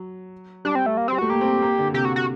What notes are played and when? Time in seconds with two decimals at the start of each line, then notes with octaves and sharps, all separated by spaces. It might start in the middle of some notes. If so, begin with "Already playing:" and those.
Already playing: F#3
0.65 G3 D4
0.75 C4
0.86 A3
0.97 A#3
1.08 G3 C4
1.18 A3 F#4
1.30 A#3 G4
1.41 C4
1.46 A#3
1.62 A#3
1.78 D3
1.94 C3 G4
2.05 F#4
2.16 F#4